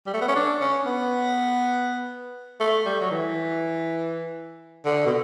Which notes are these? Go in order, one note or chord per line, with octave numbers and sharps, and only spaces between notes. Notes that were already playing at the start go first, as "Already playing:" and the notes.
G3
A3
B3
C#4
D4
C#4
B3
A3
G3
F#3
E3
D3
B2